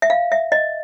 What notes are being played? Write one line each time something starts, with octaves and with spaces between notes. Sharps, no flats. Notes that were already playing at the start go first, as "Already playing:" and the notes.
E5
F5
E5
D#5